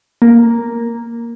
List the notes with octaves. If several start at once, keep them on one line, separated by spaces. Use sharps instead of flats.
A#3